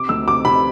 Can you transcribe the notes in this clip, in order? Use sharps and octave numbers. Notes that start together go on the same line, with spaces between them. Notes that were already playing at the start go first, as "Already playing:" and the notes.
Already playing: C3 D6
D2 E6
C3 D6
C3 B5